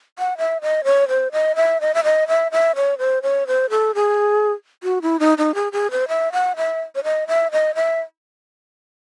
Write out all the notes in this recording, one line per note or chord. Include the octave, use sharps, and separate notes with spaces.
F#5
E5
D#5
C#5
C5
D#5
E5
D#5
E5
D#5
E5
E5
C#5
C5
C#5
C5
A4
G#4
F#4
E4
D#4
D#4
G#4
G#4
C5
E5
F#5
E5
C#5
D#5
E5
D#5
E5